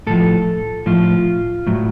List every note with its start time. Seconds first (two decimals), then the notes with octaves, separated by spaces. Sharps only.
0.07 A2 F3 A4
0.86 A2 F3 F4
1.67 A2 F#3